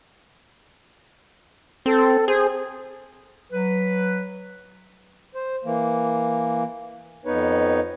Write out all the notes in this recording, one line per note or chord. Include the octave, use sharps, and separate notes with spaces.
C4 A4
G#4 C5
F#3 B4
C5
E3 A#3
F2 B3 D#4 B4 C#5